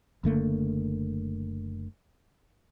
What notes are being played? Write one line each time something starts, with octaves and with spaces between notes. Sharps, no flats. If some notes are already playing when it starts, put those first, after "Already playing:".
F#1 D3 A3 A#3